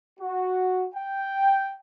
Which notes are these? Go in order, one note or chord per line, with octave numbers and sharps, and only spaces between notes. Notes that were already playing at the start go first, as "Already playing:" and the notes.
F#4
G5